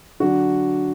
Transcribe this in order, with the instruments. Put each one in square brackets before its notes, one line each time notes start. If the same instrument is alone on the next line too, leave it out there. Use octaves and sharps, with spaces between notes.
[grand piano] D3 F#3 D4 F#4